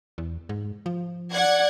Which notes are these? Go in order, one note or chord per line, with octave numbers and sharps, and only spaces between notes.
E2
G#2
F3
D5 F#5 G#6